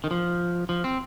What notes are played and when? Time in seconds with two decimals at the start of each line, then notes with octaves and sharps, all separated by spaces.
0.04 D#3
0.11 F3
0.69 F3
0.84 C4